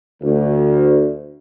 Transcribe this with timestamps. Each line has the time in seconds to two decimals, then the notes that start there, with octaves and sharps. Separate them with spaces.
0.21 D2